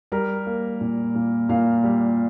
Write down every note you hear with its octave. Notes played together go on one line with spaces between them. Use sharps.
G3 A#4 A#5
A#3
A#2
A#2
A#2 F5
G3